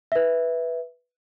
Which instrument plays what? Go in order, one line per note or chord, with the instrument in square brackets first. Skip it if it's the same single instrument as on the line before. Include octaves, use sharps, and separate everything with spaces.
[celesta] B4 E5